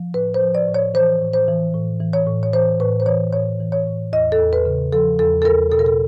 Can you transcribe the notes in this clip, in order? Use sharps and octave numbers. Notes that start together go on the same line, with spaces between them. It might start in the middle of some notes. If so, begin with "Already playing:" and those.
Already playing: F3
A2 B4
C5
F3
D5
A2
C#5
E3 C5
A2
C5
E3
A2
E3
C#5
A2
C#5
E3 C5
A2 B4
C5
E3 C#5
A2 C#5
E3
C#5
A2
E2 D#5
A4
E2
B4
C#3
F3 A4
E2 A4
A4
E2 A#4
B2 A4
A#4
A4